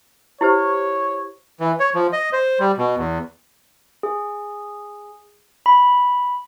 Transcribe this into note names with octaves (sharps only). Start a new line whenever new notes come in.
E4 G4 C5 C#5
E3
C#5
F3
D#5
C5
G3
B2
E2
G#4
B5